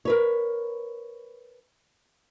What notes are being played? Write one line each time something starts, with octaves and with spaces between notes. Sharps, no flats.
A#4 B4 C#5